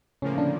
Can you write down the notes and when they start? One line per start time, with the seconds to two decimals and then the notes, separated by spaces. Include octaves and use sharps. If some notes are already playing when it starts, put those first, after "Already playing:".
0.22 A2 C#3 F3 A#3 C#4
0.38 D3 D4